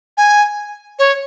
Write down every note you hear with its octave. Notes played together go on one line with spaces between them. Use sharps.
G#5
C#5